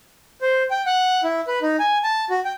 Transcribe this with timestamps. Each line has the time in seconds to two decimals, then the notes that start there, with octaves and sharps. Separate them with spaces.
0.41 C5
0.71 G5
0.86 F#5
1.24 E4
1.47 B4
1.62 D#4
1.79 G#5
2.04 A5
2.30 F#4
2.45 G5